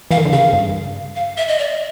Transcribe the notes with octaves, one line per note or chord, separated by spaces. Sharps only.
E3 F5
D#3
D3
C#3 F5
G2
F5
E5
D#5
D5